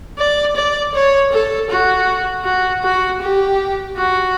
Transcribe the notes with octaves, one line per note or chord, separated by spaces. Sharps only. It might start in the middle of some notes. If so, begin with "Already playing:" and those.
D5
D5
C#5
A4
F#4
F#4
F#4
G4
F#4